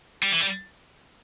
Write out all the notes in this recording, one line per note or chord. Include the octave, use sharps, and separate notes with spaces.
G3
E3
G3